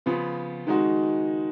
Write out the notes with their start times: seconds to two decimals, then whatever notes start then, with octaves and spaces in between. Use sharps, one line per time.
0.06 C#3 F3 B3 F4
0.67 D#3 G#3 D#4 F#4